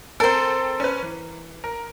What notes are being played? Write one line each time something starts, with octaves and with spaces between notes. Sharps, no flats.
C4 A4 A#4 C5
C#4 B4
E3
A#4